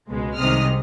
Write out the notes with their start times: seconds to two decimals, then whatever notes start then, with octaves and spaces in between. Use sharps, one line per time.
0.08 C#2 B2 G#3
0.36 C2 C3 D#3 G#3 D#6 F6